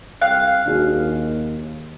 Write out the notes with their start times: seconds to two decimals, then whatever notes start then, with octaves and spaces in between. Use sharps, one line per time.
0.22 C2 F5 G5 F#6
0.66 D#2 D4 F#4 G#4